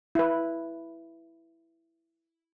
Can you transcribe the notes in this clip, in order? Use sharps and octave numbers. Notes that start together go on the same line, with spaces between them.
E4 B4